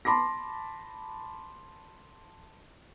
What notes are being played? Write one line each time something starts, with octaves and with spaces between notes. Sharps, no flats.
A5 B5 C6 D6 A#6